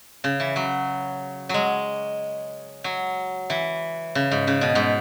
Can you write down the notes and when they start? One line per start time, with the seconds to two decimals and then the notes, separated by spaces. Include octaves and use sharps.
0.24 C#3
0.40 E3
0.56 F#3
1.49 F#3 G#3
2.84 F#3
3.50 E3
4.15 C#3
4.31 G#2
4.47 C#3
4.61 B2
4.75 G#2